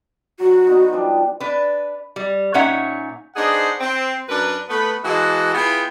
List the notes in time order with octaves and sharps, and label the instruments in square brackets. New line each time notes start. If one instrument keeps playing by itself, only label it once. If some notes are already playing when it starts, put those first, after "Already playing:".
[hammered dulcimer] F#3 [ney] F#4
[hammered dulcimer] B3 D#4
F3 G3 D4
[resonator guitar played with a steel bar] D4 B4
G3
A#2 C#4 D#4 C#5 E5 F#5
[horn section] B3 D4 D#4 G#4 C5 F#5
C4
F#2 D4 A#4 B4
A3 B3 B5
E3 G#3 A#3 F#4 D#5 A5
B3 E4 F4 G#4 G5